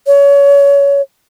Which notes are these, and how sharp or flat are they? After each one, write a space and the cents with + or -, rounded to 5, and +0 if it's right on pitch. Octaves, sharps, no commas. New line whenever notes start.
C#5 +25